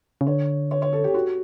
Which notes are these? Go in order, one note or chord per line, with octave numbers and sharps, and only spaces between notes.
C#3
D3 C#5
C#5
C#5
A4
G4
F#4